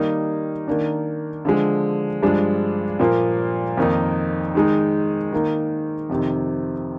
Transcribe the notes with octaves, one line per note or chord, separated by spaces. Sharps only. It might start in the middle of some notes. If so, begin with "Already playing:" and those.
Already playing: D#3 G3 A#3 D#4
D#3 A#3 D4
D3 F3 G#3
G2 F3 G#3 D4
A#2 F3 A#3
F2 D#3 A#3 D#4
D#3 G#3 D#4
D#3 A#3 D#4
F2 C3 D#3